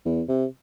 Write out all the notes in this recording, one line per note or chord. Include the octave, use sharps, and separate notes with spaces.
E2
C3